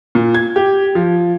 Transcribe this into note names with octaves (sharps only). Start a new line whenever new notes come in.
A#2
G#6
G4
F3